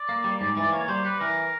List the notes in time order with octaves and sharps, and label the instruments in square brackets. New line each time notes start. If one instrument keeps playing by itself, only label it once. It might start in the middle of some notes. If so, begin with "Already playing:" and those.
Already playing: [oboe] D5
[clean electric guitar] A#3
G3
G#2
E3
[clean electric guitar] A#3 [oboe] C#5
[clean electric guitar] G3 [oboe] C5
[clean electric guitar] G3 [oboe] B4
[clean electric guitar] E3 [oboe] A#4